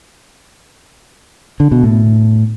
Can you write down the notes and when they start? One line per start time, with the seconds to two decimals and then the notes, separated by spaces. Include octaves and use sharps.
1.60 D3
1.72 B2
1.83 A2